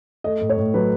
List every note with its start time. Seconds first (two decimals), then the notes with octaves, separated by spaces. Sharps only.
0.24 A3 D#5
0.41 A2
0.50 C#5
0.57 A2
0.74 F#3 B4